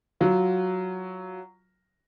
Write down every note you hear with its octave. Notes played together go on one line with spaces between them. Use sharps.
F#3 F4